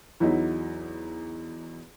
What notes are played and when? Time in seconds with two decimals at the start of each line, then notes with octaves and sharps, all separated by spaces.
0.20 E2 F#3 D#4 E4